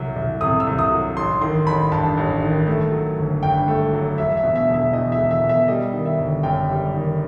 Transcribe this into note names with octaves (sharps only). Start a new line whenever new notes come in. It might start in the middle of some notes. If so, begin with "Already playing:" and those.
Already playing: C2 F#3
C2
C3 D#6
E6
C2
D#6
F#3
A1 C6
D#3 C6
A1 B5
G2 A5
A1
D#3
A3
F#3
G1
G2 G5
A3
F#3
E1 E5
E5
B2
E5
E1
E5
E2 D#5
E5
E1
E5
B2
E5
G3 D#5
D#3
E5
G1
F#2 G5
G3
D#3